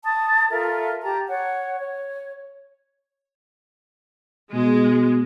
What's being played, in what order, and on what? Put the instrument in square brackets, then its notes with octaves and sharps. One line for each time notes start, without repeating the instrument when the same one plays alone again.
[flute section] A5 D#6
F4 A4 A#4 E5
G4 G5 A5 A#5
C#5 F#5
C#5
[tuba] B2 [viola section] G#3